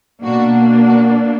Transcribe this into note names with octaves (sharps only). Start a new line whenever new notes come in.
B2 A#3 D4 F#4
F#4